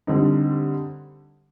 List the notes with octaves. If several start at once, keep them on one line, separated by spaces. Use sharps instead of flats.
D3 G3 C4 D#4